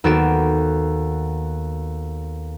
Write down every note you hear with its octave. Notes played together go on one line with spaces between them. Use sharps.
D#2 B3 F#4 A4 D7 E7